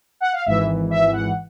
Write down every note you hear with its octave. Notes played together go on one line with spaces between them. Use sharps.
F#5
F5
G#1 G#2 E3 E5
E5
F#5